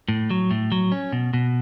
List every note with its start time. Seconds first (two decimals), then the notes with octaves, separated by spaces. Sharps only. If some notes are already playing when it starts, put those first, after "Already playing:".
0.09 A2
0.30 F#3
0.51 A2
0.72 F#3
0.92 C#4
1.12 B2
1.34 B2